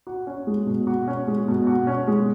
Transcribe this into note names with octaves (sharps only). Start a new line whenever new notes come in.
F#4
C#4
G#3
B2
F#4
C#4
G#3
B2
F#4
C#4
G#3